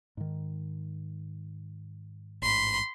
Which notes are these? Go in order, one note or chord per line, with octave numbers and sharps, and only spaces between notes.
G#2 D#3
A1 G#2 B5 C6